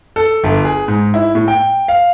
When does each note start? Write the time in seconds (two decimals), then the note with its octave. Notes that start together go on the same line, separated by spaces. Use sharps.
0.16 A4
0.44 G1
0.65 G#4
0.88 G#2
1.14 E4
1.35 A2
1.48 G5
1.88 F5